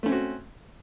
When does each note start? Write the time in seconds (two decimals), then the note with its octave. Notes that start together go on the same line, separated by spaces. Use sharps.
0.03 A3
0.06 C#4
0.09 C4
0.12 F#4